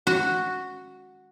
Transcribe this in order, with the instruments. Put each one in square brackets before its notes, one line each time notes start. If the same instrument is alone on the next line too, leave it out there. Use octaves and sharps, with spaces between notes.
[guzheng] F#4